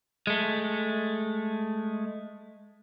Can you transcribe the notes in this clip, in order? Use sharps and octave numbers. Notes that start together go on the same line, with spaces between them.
G#3 A3